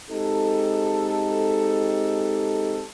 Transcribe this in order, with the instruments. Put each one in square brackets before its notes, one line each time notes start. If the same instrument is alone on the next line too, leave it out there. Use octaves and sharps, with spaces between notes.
[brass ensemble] G#3 C4 D#4 G4 A4